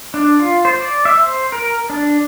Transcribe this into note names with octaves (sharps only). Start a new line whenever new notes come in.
D4
F4
C5
D5
E5
C5
A#4
D4